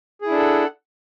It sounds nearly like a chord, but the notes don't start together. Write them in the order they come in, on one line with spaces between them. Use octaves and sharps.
G#4 E4 D4 A4 F#5